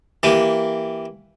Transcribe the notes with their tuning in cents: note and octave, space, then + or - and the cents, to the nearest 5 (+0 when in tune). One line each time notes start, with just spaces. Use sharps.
E3 +0 A#3 +0 G4 +0